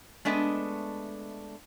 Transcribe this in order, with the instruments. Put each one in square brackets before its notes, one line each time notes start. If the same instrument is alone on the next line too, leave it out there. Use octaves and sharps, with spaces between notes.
[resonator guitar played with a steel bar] G#3 A3 B3 D4 D#5 E5